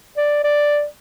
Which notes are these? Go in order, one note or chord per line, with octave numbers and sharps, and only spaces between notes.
D5
D5